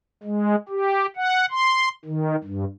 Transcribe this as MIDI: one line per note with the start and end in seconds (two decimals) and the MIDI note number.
0.23 0.56 56
0.69 1.06 67
1.16 1.46 78
1.51 1.88 84
2.05 2.36 51
2.44 2.65 43